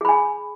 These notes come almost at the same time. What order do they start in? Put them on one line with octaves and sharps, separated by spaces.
G#4 B5 G#5